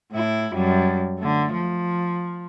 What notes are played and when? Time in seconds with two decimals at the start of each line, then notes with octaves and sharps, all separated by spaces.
0.12 A2 E4
0.53 F#2 G3
1.19 D3 A3
1.53 F3